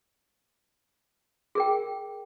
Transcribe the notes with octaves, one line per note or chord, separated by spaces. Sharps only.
G#4 A#4 G5